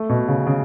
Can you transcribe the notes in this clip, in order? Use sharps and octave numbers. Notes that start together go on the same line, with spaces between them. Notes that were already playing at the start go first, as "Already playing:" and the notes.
Already playing: A3
B2
C#3
C#3